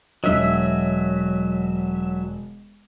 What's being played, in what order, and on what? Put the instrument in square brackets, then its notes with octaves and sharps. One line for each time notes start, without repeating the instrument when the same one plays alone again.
[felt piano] E1 D#5 [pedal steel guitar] F#3 E5